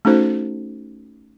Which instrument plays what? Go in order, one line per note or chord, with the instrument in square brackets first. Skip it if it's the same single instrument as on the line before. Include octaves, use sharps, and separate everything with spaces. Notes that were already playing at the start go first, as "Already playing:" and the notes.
[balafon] A3 C#4 D#4 F#4 A4 C5